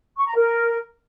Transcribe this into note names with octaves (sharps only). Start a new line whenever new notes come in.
C#6
A#5
A#4